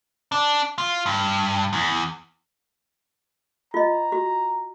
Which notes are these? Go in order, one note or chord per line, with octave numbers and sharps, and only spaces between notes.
D4
F4
G2
E2
F4 D#5 A#5
F#4